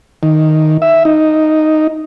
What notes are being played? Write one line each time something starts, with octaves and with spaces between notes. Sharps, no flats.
D#3
E5
D#4